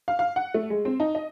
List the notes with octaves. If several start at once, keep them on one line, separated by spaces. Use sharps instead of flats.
F5
F5
F#5
A3
G#3
C4
D#4
D#5